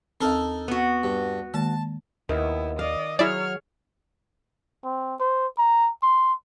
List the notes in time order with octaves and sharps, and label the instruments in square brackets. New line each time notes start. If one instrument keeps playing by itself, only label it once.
[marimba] D#2 C4 [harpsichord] D#4 A4 A#4
[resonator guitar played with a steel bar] B3 F#4
[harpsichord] G2
[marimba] D#3 G#3 A#3 [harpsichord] A5
[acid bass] D#2 [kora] D#3 [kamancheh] B3 E4
[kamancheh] D5 D#5 [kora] F5
[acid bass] F#3 [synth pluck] E4 D5 [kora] G#4 [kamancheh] C#5 F6
[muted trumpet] C4
C5
A#5
C6